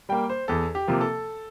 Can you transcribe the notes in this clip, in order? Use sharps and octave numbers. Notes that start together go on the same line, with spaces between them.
G3 A#3 G5
C5
E2 A4
G4
C3 F3 A#3
A4